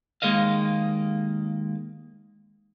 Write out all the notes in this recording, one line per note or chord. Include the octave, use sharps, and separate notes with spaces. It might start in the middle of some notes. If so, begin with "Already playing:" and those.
D#2 G#3 A#3 D#5 F5